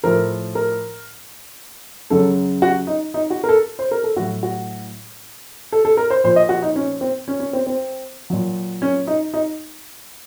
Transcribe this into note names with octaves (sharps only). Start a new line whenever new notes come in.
A2 F3 A#4
A#4
F#2 C#3 F#3 A4
F#4
D#4
D#4
F#4
A#4
A4
C5
A#4
A4
A2 F#3 F#4
F#4
A4
A4
A#4
C5
A#2 F3 C5
D#5
F#4
D#4
C#4
C4
C#4
C#4
C4
C4
A#2 F#3
C#4
D#4
D#4